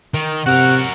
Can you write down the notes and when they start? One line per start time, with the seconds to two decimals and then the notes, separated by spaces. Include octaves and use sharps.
0.14 D#3
0.46 C3 F#4 A#4 F#5